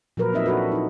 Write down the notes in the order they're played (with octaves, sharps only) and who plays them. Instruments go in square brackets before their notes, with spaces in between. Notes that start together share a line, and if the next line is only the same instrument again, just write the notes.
[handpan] A#2 F3 F#3 A#4 B4
F#3 C4 D#4 D#5 E5
D4 F#4 A4 B4
D#4 E4